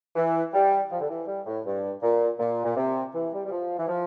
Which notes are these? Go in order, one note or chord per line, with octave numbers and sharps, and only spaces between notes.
E3
G3
F3
D3
E3
G3
A2
G2
A#2
A#2
A#2
C3
E3
G3
G3
F3
E3
F3